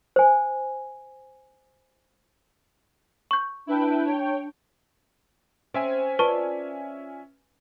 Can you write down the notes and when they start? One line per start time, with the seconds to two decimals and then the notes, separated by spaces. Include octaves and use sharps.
0.16 C5 G#5
3.31 C#6 G6
3.67 D4 E4 B4 G5
4.05 C#5 G5
5.74 C4 C#4 E5 G#5
6.19 F4 B4 D5 A5 C#6